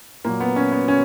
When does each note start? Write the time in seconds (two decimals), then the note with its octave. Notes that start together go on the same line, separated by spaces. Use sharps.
0.25 A#2 F#3 A#3
0.40 B3
0.56 C#4
0.72 B3
0.88 C#4